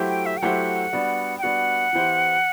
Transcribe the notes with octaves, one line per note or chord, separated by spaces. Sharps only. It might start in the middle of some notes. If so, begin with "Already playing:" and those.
Already playing: F#3 A3 E4 G4 C5
G5
E5
G5
F#3 A3 E4 G4 C5 F#5
G3 B3 D4 F#4
G5
G3 B3 D4 F#4 F#5
E3 B3 E4 G4 C5